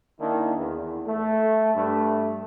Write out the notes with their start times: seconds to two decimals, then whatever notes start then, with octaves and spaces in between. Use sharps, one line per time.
0.20 D#3 A#3 D4 E4
0.56 E2
1.06 A3
1.75 G2 A3